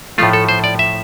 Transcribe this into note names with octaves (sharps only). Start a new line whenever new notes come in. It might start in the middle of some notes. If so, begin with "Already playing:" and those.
A2 F3 A3 F4
A4
C5
D5
E5